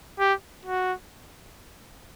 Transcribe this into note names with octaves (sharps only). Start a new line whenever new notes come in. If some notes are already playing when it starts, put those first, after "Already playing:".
G4
F#4